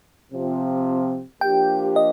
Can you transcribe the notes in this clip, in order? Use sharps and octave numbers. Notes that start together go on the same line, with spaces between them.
C3 F3 C4
F3 A#3 D4 G4 G5
D#5